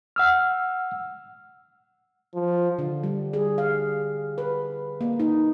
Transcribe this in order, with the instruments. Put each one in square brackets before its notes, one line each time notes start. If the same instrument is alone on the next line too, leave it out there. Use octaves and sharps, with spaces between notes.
[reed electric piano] F#5 E6 F6
[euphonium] F3
[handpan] D3
G3
G#4
F5
B4
A#3
D#4